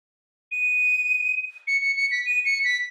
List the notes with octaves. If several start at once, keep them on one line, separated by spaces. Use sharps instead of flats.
D#7
C#7
C#7
C#7
B6
D#7
C#7
B6